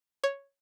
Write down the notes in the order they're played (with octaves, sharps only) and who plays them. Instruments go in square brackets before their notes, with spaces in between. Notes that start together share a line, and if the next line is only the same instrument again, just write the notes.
[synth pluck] C#5